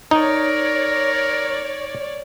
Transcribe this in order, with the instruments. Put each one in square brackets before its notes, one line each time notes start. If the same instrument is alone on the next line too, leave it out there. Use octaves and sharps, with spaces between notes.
[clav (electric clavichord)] D#4 [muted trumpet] A#4 [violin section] C#5 D5